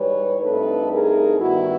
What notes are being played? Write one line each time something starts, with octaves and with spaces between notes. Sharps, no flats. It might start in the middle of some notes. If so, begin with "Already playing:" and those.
Already playing: G#2 E3 G3 B4 C#5
G2 E3 A3 C4 D#4 A4 B4
G#4 A#4
G2 D#3 G3 B3 E4 F#4